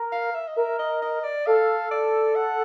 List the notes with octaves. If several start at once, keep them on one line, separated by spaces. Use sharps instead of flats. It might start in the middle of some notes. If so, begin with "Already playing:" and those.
Already playing: A#4
F5
E5
D#5
A#4 E5
D#5
D#5
D5
A4 F5
D5
F#5